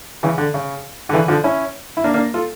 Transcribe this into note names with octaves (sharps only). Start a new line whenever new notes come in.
C#3 E3
D3
C#3
D3
C#3 E3
D3 F3
C#4 E4
E4
A#3 D4
A#3 D4
F4 A4